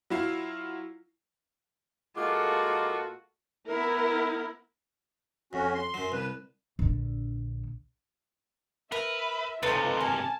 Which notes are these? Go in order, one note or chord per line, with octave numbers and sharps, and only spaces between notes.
F#3 E4 F4 C7
A#2 G#3 A#3 F4 F#4 A4 D6
B3 E4 A#4
F2 C#4 F#4
C6
F#2 F#3
C2 B4
A#1 D3
A#4 B4 E5
C#2 C3 A3 D#4 F4 B4
A#4 G#5 A5